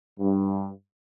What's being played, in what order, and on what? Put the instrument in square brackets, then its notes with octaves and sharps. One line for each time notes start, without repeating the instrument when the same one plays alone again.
[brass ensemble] G2